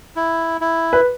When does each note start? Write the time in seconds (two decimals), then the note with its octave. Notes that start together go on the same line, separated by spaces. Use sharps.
0.16 E4
0.61 E4
0.93 B4